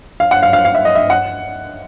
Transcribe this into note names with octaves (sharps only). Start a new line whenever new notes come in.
F5
F#5
F5
F5
F5
E5
D#5
E5
F#5